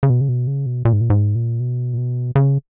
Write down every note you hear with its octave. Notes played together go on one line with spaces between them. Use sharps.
C#3
B2
C#3
B2
C#3
B2
A#2
G#2
A#2
G#2
A#2
B2
A#2
B2
C#3